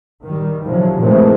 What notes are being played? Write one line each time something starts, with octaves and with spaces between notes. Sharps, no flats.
D#3 G3
C3 F3 F#3
A#2 D#3 E3 G#3 A3 C4